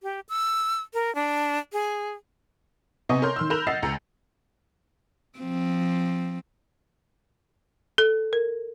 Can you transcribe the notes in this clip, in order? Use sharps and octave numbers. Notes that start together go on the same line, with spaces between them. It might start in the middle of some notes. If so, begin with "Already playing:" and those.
G4
E6
A#4
D4
G#4
C3 B3 D#5 G#5 C#6 D#6
A#4 C#5 C6 F6 G6
D#3 C6 E6
A#4 B5 F#6 G6 E7 F7
D#5 F#5 E6 A6 C7
C#2 A#5 C#7
F3 C4
A4
A#4